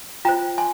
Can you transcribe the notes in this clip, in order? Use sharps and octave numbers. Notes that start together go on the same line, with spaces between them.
F4 C5 G5 A#5
G#5 C6